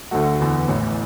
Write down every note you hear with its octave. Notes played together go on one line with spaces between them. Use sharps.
D2 D3 A3 F#4
E2 D3 B3
A1 A2 E3